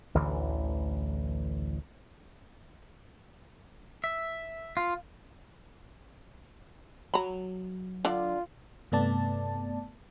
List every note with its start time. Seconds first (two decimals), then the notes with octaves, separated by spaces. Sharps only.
0.15 A1 D2 D3 E3
4.04 E5
4.77 F4
7.14 F#3 A#5 B5
8.05 D3 D4 F4 D5
8.92 G2 C3 A3 B3 D5 A5